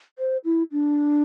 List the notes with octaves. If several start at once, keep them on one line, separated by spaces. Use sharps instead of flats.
C5
E4
D4